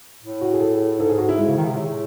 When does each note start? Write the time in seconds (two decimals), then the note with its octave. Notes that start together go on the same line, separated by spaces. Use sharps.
0.22 A2
0.41 F#4
0.53 G#4
0.61 A4
0.99 G#2 A4
1.09 G#4
1.18 F#4
1.29 E4
1.38 G#3
1.48 C#3
1.57 D#3
1.66 C3
1.76 A2